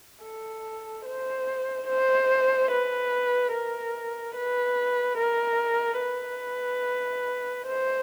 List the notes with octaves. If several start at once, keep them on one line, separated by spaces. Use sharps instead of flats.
A4
C5
C5
B4
A#4
B4
A#4
B4
C5